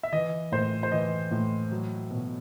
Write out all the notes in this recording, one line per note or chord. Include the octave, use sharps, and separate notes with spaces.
E5
E3 D#5
A2 C5
C5
E3 D#5
A2
F#3
B2